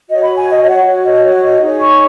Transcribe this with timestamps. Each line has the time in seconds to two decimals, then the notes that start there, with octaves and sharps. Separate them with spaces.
0.09 F#4 C#5 D#5
0.22 B5
0.34 G#5
0.47 D#5
0.63 D#5
0.66 F#5
0.85 F#4 C#5
1.04 D#5
1.24 C#5
1.42 D#5
1.61 D#4 G#4 C#5
1.81 C#6